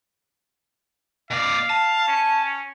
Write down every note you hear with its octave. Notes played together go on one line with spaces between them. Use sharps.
B2 D5 F5
A5
C#4